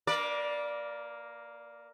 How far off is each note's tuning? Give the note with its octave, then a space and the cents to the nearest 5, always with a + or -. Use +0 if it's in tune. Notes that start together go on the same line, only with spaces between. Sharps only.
A#3 +0 B4 -40 D5 +0